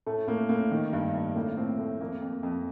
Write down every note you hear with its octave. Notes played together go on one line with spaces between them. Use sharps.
A2 A3
A2 A#3
A2 A#3
D#3
G2
G2
A2 A#3
A2 A3 C4
A2 A3
F2 A#3
F2
F2